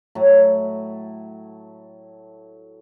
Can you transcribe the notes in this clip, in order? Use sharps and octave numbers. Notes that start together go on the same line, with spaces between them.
A2 F#3